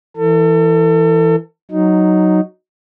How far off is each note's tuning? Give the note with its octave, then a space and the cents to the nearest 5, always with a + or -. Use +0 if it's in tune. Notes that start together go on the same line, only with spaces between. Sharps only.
E3 +0 A4 +35
F#3 +0 D#4 +0